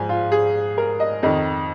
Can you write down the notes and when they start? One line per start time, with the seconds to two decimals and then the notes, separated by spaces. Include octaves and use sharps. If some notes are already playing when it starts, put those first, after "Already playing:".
Already playing: G#2 F3 G#5
0.09 F4
0.32 G#4
0.78 A#4
1.00 D#5
1.23 F2 D#3 D#5